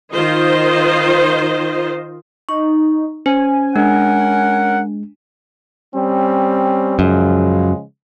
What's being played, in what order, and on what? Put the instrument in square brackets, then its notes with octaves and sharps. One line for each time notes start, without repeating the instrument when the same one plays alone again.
[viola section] D#3 F4 C5 D#5
[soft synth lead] D#4 [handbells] C#6
[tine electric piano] C#4 [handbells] C5 [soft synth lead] G#5
[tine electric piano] G#3 [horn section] C#4 A#4 F#5 [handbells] D4
[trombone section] G3 C4 C#4
[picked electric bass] F#2 [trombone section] C#3 F3 G#3